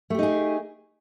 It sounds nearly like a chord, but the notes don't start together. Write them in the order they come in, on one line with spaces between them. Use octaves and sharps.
A3 G4 D#4 G#4